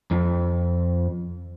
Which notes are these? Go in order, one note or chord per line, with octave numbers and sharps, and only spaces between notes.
F2